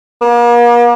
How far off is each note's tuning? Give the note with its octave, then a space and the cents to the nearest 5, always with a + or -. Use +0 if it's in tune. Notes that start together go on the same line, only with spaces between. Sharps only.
A#3 +40